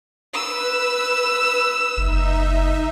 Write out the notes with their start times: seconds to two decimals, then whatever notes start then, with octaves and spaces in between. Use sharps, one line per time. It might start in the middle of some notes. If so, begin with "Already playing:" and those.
0.34 B4 E6
1.97 F#1 D#4 E5